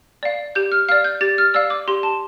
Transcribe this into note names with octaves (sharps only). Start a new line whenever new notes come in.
D5 F5
G4 G6
F6
D5 F5 F6
G6
G4 A6
F6
D5 F5 E6
D6
G4 C6
A5